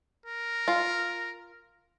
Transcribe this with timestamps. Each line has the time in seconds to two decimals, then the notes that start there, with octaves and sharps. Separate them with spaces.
0.26 A#4
0.68 F4